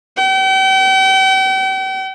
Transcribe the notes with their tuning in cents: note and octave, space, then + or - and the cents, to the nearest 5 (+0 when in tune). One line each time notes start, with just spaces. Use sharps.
G5 -40